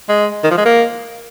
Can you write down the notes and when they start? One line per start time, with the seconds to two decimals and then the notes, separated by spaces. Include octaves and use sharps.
0.09 G#3
0.43 D#3
0.51 F3
0.57 G#3
0.65 A#3